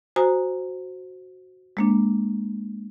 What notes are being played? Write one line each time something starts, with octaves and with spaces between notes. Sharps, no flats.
F#4 C5 G#5 A#5 D#6
G#3 A#3 D4